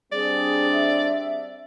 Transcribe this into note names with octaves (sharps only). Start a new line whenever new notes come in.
G3 C4 D4 G#4 D5
E5